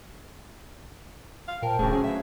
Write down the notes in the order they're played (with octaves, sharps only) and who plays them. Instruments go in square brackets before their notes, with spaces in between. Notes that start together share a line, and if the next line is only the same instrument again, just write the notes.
[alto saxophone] F5
[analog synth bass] A#2 [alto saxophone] A#4 [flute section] C5 G5 A5
[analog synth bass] D1 [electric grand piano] D2 C#3 A3 [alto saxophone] G#4
[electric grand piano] F#3 [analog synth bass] C#4 [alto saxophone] G#4
[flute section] B4 C#5 F5 [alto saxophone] E5